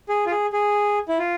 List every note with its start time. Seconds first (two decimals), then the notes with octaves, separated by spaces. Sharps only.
0.09 G#4
0.26 F4
0.31 G#4
0.53 G#4
1.09 E4
1.19 F4